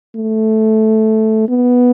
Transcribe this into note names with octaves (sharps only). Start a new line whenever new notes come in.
A3
B3